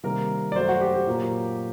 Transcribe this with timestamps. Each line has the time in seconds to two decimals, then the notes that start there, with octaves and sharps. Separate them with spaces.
0.04 C3 D#3 G3 A#3 A#4
0.52 D5
0.55 F#2 F#3 A3 C5
0.69 F#4
0.81 G4
0.94 G4
1.07 A#2 F#3 A#3